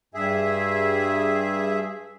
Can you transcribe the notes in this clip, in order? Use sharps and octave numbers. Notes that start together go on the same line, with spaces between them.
G2 G#4 E5